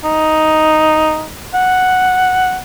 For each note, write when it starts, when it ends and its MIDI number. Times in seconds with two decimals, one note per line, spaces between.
0.04 1.26 63
1.54 2.59 78